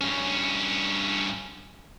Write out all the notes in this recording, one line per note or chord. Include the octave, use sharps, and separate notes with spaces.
G2 C#4